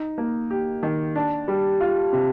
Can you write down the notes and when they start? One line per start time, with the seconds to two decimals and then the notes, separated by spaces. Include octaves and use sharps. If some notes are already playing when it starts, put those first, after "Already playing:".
Already playing: D#4
0.18 A#3
0.51 G4
0.83 D#3
1.15 D4
1.48 G3
1.81 F4
2.13 C3